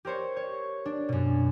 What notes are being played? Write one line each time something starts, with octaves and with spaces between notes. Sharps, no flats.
G4 A#4 C5 C#5
C#5
D4
F#2 B2